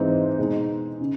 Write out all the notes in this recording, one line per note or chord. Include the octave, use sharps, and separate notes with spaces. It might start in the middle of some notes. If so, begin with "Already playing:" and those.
Already playing: G#2 E3 G#3 C4 D#4
B2 G#3 B3 D#4
C#3